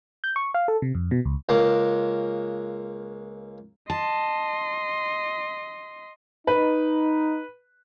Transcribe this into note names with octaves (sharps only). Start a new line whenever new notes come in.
G6
C#6
F5
A4
C3
F2
B2
C#2
C#2 A#3
D#5 A5 C6
D#4 B4